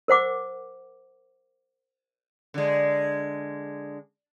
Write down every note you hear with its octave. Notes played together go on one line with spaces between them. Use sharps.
A#4 C5 F#5 D6
D3 G#3